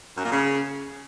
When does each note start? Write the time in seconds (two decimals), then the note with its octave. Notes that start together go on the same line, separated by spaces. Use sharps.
0.17 F#2
0.24 A#2
0.31 C#3